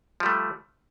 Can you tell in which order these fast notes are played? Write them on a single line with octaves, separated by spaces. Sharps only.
F3 G3 A3